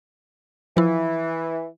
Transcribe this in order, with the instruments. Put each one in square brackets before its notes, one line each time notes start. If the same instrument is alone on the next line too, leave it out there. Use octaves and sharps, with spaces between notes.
[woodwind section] E3 [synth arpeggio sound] F3 E4